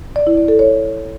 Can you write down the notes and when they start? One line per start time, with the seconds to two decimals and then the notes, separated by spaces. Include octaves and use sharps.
0.16 D5
0.27 E4
0.38 D5
0.48 A4
0.59 C#5